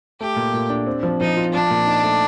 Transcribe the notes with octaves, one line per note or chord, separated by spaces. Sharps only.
A3 G4
A#2
A#2
D4
C4
F3
F3 D#4
F4
F3 D4
A#2
D#4
A3